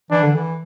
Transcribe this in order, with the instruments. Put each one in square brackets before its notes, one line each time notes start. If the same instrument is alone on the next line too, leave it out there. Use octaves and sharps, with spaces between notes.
[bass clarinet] E3 [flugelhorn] D4
[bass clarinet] D3
E3